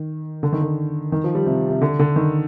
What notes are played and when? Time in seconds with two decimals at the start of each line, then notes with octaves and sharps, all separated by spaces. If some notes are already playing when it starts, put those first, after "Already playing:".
Already playing: D#3
0.43 D3
0.53 D#3
0.61 D3
1.12 D#3
1.24 F3
1.35 G3
1.46 C3
1.70 C3
1.81 D3
1.99 D3
2.16 D#3